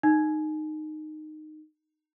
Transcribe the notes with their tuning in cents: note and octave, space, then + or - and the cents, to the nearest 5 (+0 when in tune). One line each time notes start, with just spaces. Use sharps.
D#4 -15